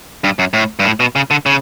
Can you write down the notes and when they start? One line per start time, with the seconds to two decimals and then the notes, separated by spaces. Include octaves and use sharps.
0.24 G2
0.39 F#2
0.53 A2
0.79 G2
0.85 A2
1.00 B2
1.16 C#3
1.31 D3
1.46 C#3